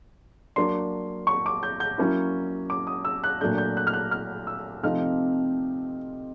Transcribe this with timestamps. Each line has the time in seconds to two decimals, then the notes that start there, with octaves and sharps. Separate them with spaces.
0.56 F#3 A#3 D4 C6
1.27 C#6
1.46 D6
1.63 G6
1.80 G6
1.98 F#3 A#3 C#4 E4
2.70 D6
2.87 D#6
3.05 E6
3.24 F#6
3.41 A#2 F#3 A3 D4 G6
3.58 G6
3.77 F#6
3.87 F6
3.93 F#6
4.11 F6
4.47 E6
4.83 C3 F3 A3 C4 D#4 F6